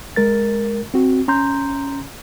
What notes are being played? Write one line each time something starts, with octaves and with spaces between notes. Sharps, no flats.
G#3 A#4 A6
C4 F#4
C#4 A#5 C6 G6